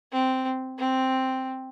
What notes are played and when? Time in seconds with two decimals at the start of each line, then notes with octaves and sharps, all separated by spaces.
0.13 C4
0.79 C4